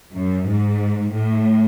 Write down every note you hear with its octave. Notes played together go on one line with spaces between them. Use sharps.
F#2
G#2
A2